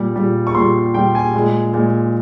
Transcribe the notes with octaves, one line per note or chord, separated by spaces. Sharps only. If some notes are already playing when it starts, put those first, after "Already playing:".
Already playing: A#2 G3
A#2 G3
C#6
A#2 G3 C6
A#2 G3 G5
G#5
A#2 G#3
A#2 G#3